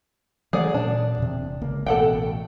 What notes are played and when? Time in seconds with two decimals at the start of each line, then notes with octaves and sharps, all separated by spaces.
0.53 E3 F#3 A3 G#4 D5 F#5
0.74 A#2 D4
1.18 E1 C3
1.62 C#2 A#3
1.86 A1 B2 A4 F#5 G5